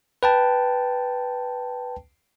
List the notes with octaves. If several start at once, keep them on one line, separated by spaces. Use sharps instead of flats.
B4 G5 A5